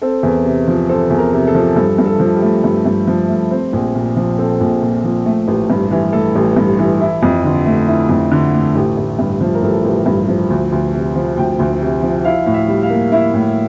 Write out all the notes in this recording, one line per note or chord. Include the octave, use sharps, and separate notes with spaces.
C4 A4
E2
C3
F3
C4 A4
E2
A#4
C3
A4
F3
G2 A4
G2
A4
F3
G4
A3
G2
G2
F3
A3
C4
A#1
A#2
F3
C4 A4
A#1
A#2
F3
A3
A1
G2
E3
A3 A4
A1
G2
E3
E4
F2
D3
A3
E4
F2
D3
A3
A1
A1
G2
F3
A#4
A1 A4
A1
G2
F3
D2
D2
C3
F3
D2 G5
D2
C3
F3
E4 F5
A2
E5
G3
F5
A#3
E4
A2